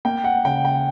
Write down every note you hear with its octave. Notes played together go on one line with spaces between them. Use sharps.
A#3 G5
F#5
C#3 G5
G5